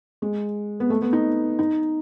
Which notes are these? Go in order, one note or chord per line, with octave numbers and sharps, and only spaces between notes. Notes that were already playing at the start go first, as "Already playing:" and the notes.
G#3
B3
A3
B3
D#4
D#4